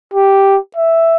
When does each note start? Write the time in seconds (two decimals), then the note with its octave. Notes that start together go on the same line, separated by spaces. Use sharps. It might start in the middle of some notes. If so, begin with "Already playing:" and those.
0.14 G4
0.77 E5